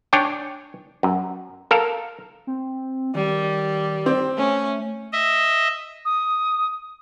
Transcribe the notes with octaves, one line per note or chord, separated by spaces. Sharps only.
D4 C#5 D5 G5 G#5
F#2
A4 A#4 F5
C4
D#3 G3
C4
A3 C#4
D#5 E5
D#6